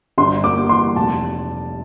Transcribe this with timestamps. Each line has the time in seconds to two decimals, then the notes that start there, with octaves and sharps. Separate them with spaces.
0.18 G1 C6
0.44 A#3 D6
0.69 E3 C6
0.96 F1 A5